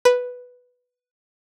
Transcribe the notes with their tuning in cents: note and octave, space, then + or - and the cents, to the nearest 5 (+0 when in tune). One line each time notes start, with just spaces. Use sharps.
B4 +0